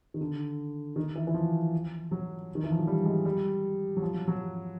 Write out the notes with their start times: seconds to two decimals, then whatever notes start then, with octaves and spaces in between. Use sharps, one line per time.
0.14 D#3
0.21 D3
0.96 D#3
1.15 E3
1.27 E3
1.34 F3
2.11 F#3
2.55 D#3
2.63 E3
2.71 F3
2.79 F#3
2.87 G3
3.06 G#3
3.25 G3
3.97 F#3
4.02 F3
4.14 F#3
4.28 F#3